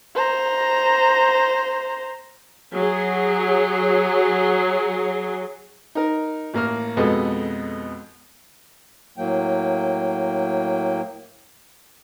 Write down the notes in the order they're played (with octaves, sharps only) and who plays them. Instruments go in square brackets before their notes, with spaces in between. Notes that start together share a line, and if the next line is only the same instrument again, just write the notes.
[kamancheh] C5 A#5
[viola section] F#3 G#4
[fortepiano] D#4 A#4
A1 A#3 F6
F2 B2 G#3 B3 A4 D#5
[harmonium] A2 F#3 A#3 G5